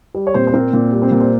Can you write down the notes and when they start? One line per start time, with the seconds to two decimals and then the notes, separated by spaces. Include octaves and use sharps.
0.15 G3
0.27 C#5
0.34 A#2 C4 C5
0.47 C5
0.54 A#3 C4 A#4
0.73 A#2
0.92 G3
1.02 C4 C5
1.12 A#2
1.21 C5